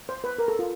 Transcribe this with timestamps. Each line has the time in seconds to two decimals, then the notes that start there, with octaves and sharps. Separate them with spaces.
0.09 C5
0.24 B4
0.38 A#4
0.48 A4
0.59 F4